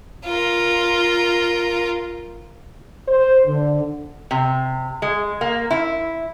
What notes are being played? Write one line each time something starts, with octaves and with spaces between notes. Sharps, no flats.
F4 A#4
C5
D3
C3
G#3
A#3
E4